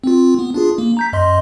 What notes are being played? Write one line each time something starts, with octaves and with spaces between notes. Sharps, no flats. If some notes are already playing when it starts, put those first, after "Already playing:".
C4 F4
B3
D4 F4 G#4
A#3
A#5 G6 B6
F#2 D#5 C6